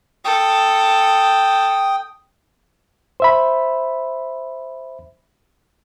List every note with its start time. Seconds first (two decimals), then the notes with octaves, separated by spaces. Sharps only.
0.25 A4 G5 D#6
3.20 C5 E5 B5